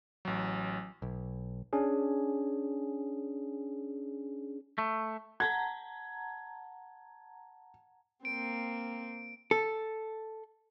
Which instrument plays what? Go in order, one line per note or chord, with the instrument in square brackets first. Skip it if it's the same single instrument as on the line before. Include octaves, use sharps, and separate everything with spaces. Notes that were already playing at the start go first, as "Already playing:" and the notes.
[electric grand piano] A1 F#3
[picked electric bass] B1
[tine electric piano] C#4 D4 G#4
[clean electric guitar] A3
[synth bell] F#5 A5 A#5 [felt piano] G#6
[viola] A#3 C4 [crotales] D7
[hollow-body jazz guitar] A4